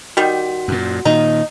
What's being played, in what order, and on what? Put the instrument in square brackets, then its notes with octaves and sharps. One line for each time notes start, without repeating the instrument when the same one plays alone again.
[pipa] D#3 G3 [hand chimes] F#4
[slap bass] F#2 A#2
[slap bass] A#2 D#3 [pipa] D#4